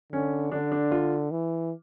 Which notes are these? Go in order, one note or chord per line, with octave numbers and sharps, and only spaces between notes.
D3 C#4
D3 D4
D4
F4
E3